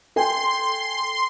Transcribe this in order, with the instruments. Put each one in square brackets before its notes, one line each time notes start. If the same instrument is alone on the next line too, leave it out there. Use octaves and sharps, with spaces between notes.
[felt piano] A4 G5 G#5 [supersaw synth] C6